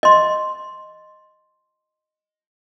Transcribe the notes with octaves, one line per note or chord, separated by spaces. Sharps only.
D#5 C6